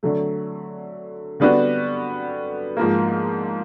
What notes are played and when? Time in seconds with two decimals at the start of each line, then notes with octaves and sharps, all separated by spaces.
0.03 D3 F#3 A3
1.40 D3 G3 B3 D4 F#4
2.77 G#2 F3 A#3